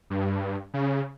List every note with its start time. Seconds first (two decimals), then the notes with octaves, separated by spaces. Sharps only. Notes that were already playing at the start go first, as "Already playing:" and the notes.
0.10 G2
0.74 C#3